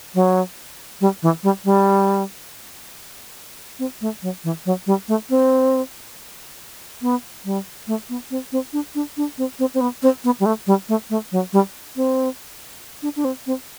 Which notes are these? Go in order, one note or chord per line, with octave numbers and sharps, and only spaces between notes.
F#3
G3
E3
G3
G3
C4
A3
F#3
E3
F#3
G3
A3
C4
B3
G3
A3
B3
C4
C4
D4
D4
D4
C4
C4
C4
B3
C4
B3
G3
A3
G3
A3
A3
F#3
G3
C4
D4
D4
C4
C4